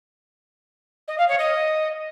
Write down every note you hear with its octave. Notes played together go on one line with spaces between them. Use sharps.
D#5
F5
C#5
D#5